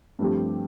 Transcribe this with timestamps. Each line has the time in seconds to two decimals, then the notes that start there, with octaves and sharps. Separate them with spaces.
0.19 G2 F3 A3 C4 G4